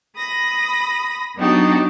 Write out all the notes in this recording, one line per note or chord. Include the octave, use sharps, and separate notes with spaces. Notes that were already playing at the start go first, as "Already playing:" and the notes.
B5 D#6 A#6
F#3 B3 D4 D#4 F#4 G4